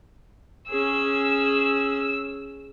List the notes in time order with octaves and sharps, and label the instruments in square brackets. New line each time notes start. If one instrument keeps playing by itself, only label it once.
[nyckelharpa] C#4 G#4 [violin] E6